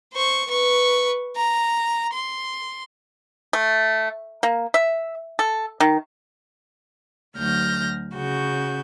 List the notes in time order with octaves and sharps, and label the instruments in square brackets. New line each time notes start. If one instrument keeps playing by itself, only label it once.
[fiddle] C5 C#6
B4 C#6
A#5
C6
[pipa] A3
A#3
E5
A4
D#3
[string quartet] D2 F#3 F6 G6 A#6
C#3 F#4 G6